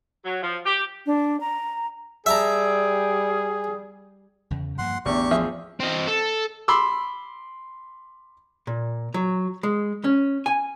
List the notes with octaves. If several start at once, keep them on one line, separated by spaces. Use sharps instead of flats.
F#3
F3
G4
D4
A#5
G3 G#4 E5 A5 A#5
E2 C#3
G2 F3 A#3 F#5 C6
A1 E2 D4 G4 C#6
F3 G#4 E5
C4 D#5
A4
B5 C6 D6 E6
A#2
F#3
G#3
C#4
G#5